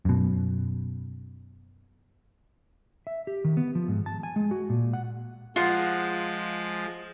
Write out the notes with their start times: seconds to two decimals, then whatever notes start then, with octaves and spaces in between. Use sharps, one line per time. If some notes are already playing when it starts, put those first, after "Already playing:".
0.05 F#2 B2
3.07 E5
3.27 G4
3.44 D#3
3.57 B3
3.75 F3
3.88 G#2
4.06 A5
4.23 G#5
4.36 G#3
4.51 F#4
4.69 A#2
4.93 F#5
5.56 F3 G#3 F4 F#5